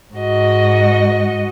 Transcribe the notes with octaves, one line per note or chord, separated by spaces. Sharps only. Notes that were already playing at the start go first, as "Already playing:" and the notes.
G#2 F#4 D#5